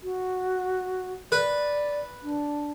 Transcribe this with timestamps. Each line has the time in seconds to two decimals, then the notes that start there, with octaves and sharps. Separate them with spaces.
0.03 F#4
1.32 B4 D5
2.23 D4